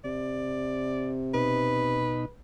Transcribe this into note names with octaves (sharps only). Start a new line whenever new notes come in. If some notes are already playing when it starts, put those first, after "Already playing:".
C3 D5
B2 D#4 B4